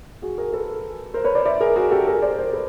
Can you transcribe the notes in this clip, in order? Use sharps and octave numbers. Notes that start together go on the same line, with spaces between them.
F#4 G#4
G#4 A#4
A4 B4
A#4 C5
B4 C#5
C5 D5
D5 E5
G#4 A#4
F#4 G#4
G4 A4
G#4 A#4
C5 D5
A#4 C5
A4 B4